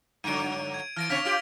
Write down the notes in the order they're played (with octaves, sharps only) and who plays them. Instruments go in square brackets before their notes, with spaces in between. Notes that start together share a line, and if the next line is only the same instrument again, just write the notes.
[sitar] G2 D3 F#3 [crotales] D7 D#7
[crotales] G#6
[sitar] E3 [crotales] F6 A#6 D7
[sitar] C#3 C4 C#5 [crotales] F6 B6 F7
[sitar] F4 G4 [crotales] F6 D7 F#7